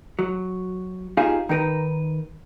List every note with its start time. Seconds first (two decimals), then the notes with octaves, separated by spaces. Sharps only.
0.19 F#3
1.17 D#4 F4 G4 G#4 C5 F5
1.49 D#3 D#4 A#4 B4